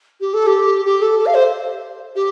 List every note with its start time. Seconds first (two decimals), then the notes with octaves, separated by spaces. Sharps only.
0.20 G4
0.33 A4
0.46 G4
0.85 G4
1.02 A4
1.18 A4
1.26 F5
1.34 C5
2.15 G4